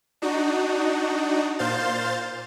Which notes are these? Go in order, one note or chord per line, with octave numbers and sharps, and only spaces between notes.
D4 D#4 F#4
A#2 C5 F5 G6 A6